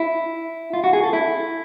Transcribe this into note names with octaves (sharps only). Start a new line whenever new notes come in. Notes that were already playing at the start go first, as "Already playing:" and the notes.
Already playing: E4
F4
F#4
G#4
A4
E4